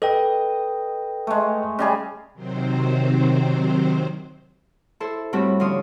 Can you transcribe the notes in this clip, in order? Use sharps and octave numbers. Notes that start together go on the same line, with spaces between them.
A4 B4 D#5 G5
G#3 A3
C#3 G3 G#4
C3 D#3 F#3 C4 C5
E4 A4 C5
A2 G3 A3 C4 F#4 A4
D3 F3 C#4 C6 D#6